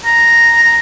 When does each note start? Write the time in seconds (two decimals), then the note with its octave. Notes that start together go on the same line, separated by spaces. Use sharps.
0.05 A#5
0.63 A#5